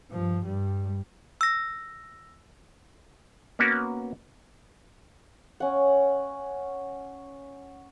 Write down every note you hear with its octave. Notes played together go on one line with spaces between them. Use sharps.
G2 F3
G2 G3
E6 A#6
A#3 B3 C#4 F#4 A#4
C#4 F#5